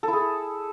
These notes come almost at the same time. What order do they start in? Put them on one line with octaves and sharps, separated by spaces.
A4 E4 G#4